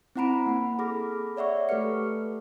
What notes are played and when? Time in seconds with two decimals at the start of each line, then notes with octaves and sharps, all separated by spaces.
0.16 C4 E4 F#5 A#5 B5 D7
0.46 A#3 F#5
0.79 G#4 A4 B5 D6 F6 A#6
1.37 C#5 D5 E5 F#5 C#6
1.69 A3 G4 A4 B4 F6 C#7